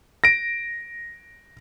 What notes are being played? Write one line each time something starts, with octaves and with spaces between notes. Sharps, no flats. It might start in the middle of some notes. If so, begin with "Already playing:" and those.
A#6 D7